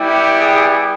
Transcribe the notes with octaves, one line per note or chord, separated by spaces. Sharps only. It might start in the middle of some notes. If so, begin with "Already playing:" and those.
Already playing: G3 B3 E4 G4
G#4